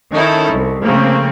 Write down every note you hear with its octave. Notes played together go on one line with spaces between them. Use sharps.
D#3 C#4 D#4 E4 A4
C2
C#3 F3 A3 A#3 C4